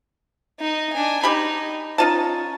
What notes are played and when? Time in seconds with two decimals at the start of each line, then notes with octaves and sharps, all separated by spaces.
0.60 D#4 D#5
0.93 D4 G#5
1.23 D#4 G4 B5
1.98 C#4 D#4 F4 A5